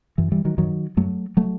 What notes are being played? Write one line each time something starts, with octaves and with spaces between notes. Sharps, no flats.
F#2 E3
E3 G3
D#3 F#3
F#2 D#3 F#3
F#2 F#3 A3
F#3 A3